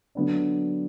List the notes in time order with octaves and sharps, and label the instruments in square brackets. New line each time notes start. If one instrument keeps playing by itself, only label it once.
[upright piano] D3 F#3 B3 D4